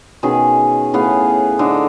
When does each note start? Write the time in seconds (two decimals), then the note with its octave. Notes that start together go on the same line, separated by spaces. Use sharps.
0.23 B2 D#3 C#4 G#4
0.93 A2 B3 G#4 F5
1.59 D3 D#4 C5